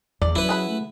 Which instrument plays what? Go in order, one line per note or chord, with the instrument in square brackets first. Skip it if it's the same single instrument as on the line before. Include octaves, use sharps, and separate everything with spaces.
[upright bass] E2 [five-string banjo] D5
[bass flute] F#3 [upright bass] C#4 [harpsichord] E4 B4
[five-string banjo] G#4 F#5 B5
[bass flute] A3